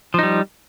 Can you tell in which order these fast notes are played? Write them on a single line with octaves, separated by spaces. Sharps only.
F3 D#4 G3